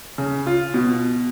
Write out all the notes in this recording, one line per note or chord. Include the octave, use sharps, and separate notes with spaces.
C#3
F4
B2